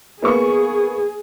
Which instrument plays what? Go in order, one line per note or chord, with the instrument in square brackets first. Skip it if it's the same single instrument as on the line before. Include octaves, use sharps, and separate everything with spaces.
[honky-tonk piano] A#3 B3 C#6 [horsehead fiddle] G#4